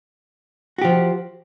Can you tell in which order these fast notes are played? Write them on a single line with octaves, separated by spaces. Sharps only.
F#4 G4 F3